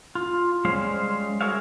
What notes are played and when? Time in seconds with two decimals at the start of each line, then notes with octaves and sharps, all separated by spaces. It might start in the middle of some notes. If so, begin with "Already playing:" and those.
0.15 F4
0.65 G3 G#3 C#4 C5 F5
1.41 F#4 G#4 A#4 C#5 E5 F5